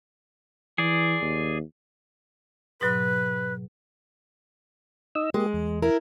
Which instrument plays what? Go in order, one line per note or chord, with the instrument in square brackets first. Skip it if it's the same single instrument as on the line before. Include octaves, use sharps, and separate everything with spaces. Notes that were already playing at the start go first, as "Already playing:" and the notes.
[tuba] E3 [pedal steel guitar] G#4 D5
[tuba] D#2
[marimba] G#2 B2 F#3 [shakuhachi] B4
[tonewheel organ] D#4 D#5 E6
[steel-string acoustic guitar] G#3 [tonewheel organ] A#3 G4
[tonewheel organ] E2
[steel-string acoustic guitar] E4 A#4